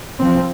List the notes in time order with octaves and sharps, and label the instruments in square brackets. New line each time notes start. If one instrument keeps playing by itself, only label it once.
[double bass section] F3 C4